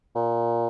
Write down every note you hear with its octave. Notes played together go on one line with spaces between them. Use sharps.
A#2